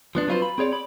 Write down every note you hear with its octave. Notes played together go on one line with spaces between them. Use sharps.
F3 B3 D4
F#3 C4 E4 F4 B4 C5
B5
C4 G#4 C#5 D5
B5